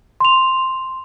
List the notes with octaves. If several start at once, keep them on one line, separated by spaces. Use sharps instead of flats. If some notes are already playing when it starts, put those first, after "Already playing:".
C6 F7